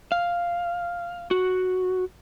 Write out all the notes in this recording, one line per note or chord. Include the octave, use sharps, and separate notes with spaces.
F5
F#4